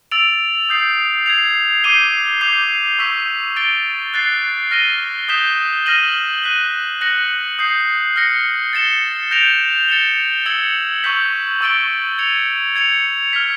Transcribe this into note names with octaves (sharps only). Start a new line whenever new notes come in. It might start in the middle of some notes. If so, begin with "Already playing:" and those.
E6 A6 D7 F7
D#6 G6 C7
G#6 C7 F7
D6 G6 C7 D#7 G7
D6 G6 C7 F7
C#6 E6 G6 B6
A6 D7 G7
F#6 A6 C7
F6 A#6 D#7 G7
D#6 G6 B6 E7 G7
F6 A#6 D#7 F#7
F#6 B6 D#7
F#6 A#6 C#7 F#7
D#6 G6 C7
F6 A#6 C#7
A6 C#7 E7 G7
G6 A#6 D7 F7
A6 C#7 E7 G7
E6 G#6 C#7 F#7
C#6 E6 G6 B6
C#6 E6 A6 D7 G7
G#6 C#7 F7
G#6 C#7 F7
F6 G#6 B6